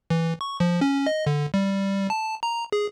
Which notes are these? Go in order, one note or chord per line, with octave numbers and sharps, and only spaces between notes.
E3
C#6
F3
C#4
D#5
D3
G3
A5
A#5
G#4